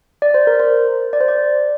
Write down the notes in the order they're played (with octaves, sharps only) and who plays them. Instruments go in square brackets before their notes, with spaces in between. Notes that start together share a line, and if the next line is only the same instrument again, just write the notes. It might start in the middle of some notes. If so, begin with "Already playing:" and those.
[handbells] D5
C5
A#4
C5
D5
C5
D5